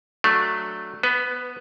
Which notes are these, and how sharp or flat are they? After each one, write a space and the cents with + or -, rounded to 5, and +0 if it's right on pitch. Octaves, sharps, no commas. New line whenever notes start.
F#3 -5 A3 +0 D4 +0
B3 +0 B4 +25